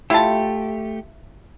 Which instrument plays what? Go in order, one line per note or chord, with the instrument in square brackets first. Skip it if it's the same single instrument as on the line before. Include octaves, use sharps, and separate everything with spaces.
[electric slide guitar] A3 G4 [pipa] E4 F4 A5